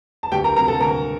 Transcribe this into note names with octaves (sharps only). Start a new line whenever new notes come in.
A5
D2 G4 G5
A#4 A#5
C3 F#3 C4 A#4 A#5
A4 A5
D2 A#4 A#5